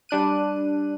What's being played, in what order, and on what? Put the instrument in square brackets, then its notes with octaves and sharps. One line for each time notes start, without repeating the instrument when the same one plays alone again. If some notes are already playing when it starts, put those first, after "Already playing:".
[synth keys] G3 D4 F#6 D#7